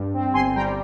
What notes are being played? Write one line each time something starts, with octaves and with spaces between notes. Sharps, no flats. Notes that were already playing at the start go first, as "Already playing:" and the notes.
Already playing: G2
C4
G1 G#5 C6
G3 G5 A#5